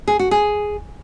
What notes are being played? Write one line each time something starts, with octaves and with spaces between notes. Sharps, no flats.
G#4
F#4
G#4